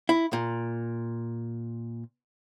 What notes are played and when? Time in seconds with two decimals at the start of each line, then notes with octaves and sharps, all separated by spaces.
0.09 E4
0.33 A#2